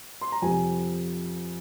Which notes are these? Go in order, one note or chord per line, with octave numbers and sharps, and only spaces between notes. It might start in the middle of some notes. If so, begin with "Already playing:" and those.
C6
A#5
F2 C3 G3 C4 G#5